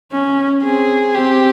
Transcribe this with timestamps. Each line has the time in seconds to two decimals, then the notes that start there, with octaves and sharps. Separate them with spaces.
0.12 C#4
0.63 C4 G#4
1.15 C4 G4